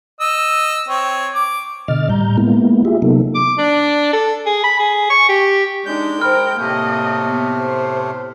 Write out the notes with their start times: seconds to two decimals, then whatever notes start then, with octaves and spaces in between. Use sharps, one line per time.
0.21 D#5 E6
0.88 C4 C#5
1.34 D6
1.88 B2 D3 D#5 F6 A6
2.10 A2 G3 A#5 G6
2.38 G#3 A#3 B3 E4
2.85 F4 G4 G#4 E5
3.02 C3 F#3 A#3 B3 D#4 A4
3.35 D6
3.58 D4
4.13 A4
4.46 G#4
4.64 B5
4.79 G#4
5.10 C#6
5.29 G4
5.86 G#3 D4 D#4 G6
6.21 A#4 C5 G5 B5 F6
6.59 A2 C3 A3 A#3 D#5
7.26 B3
7.58 C5